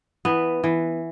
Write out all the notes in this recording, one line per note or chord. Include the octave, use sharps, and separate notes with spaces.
E3 B3
E3